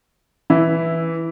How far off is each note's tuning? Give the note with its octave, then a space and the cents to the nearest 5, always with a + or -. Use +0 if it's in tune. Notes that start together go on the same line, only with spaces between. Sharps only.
E3 +0 E4 +0